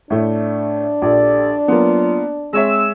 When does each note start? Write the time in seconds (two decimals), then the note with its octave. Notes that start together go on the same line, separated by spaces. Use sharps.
0.10 A2 A3 D4 E4
1.02 A#1 G4 A4 D5
1.68 F#3 A#3 B3 F4
2.53 G#3 C4 C#5 E5 E6